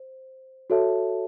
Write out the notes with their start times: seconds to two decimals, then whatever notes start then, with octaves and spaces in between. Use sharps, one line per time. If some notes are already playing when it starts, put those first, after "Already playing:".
Already playing: C5
0.70 F#4 A4 C#5 E5 A5